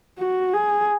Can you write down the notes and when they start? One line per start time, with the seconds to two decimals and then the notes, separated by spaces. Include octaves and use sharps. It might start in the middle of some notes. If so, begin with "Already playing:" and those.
0.18 F#4
0.53 G#4